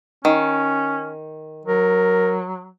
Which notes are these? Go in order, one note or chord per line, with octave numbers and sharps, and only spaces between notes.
D#3 C#4
F#3 A#4